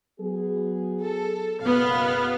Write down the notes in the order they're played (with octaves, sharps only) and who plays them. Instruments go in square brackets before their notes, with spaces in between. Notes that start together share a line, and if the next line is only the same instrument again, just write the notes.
[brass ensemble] F#3 B3 G#4
[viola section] A4
[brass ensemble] F#1 B2 [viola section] B3 F5